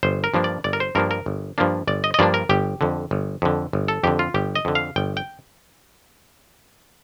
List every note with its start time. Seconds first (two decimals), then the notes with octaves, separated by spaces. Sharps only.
0.03 G1 C5
0.24 A#4
0.34 G2 F3 A#3 D4
0.44 D5
0.64 G1 D5
0.73 A#4
0.80 C5
0.95 G2 F3 A#3 D4 A#4
1.11 A#4
1.26 G1
1.58 G2 F3 A#3 D4
1.87 G1 D5
2.04 D#5
2.14 D#5
2.19 G2 F3 A#3 D4 D5
2.34 A#4
2.49 G1 G4
2.81 F2 D3
3.11 G1
3.42 F2 D3
3.73 G1
3.88 A4
4.03 F2 D3 G4
4.19 F4
4.34 G1 G4
4.56 D#5
4.65 F2 D3
4.75 F5
4.96 G1 G5
5.17 G5